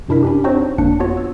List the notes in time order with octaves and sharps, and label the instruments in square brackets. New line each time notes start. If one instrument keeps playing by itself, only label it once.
[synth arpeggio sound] F#2 C3 D4 E4 A#4 B6
C#4 D4 G4
C4 D4 D#4 F#4 C5 C#5
G1 F2 A#3 D4 F#6 C#7
B3 F4 F#4 C#5
E6